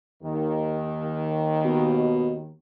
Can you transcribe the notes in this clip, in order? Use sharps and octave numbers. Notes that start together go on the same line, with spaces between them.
D#2 D#3
B2